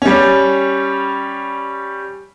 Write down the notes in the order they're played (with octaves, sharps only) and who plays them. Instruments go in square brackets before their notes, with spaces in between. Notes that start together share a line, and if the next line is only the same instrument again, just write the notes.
[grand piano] G3 C#4